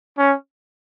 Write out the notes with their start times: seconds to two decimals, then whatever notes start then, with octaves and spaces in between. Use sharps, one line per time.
0.18 C#4